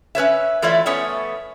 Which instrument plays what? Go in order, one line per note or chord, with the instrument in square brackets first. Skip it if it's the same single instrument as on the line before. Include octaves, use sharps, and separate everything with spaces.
[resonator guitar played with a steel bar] C#4 B4 C#5 E5
E3 A3 F4 C#5 D5 E5
A3 B3 C#4 C#5